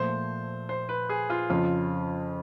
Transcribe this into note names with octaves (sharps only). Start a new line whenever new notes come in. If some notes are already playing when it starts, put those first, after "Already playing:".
Already playing: A#2 F3 A3 C5
C5
B4
G#4
F4
F2 C#3 F3 F4